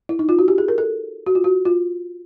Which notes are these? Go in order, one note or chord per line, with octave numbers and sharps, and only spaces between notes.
E4
D#4
F4
F#4
G4
G#4
A#4
A4
F#4
F4
F#4
F4